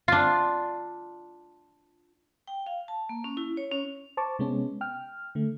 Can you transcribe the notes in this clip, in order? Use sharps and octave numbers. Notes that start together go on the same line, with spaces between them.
D4 F4
G5
F5
A5
A#3
C#4
E4
C#5
C#4
C5 A5 C#6 D6
C3 G#3 B3 C#4
G5 F6
D3 A3